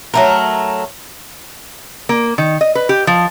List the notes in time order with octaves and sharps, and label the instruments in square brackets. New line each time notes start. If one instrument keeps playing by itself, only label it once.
[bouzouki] F#3 A3 A#4
[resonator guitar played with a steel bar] A#3
D#3
D#5
B4
G4
F3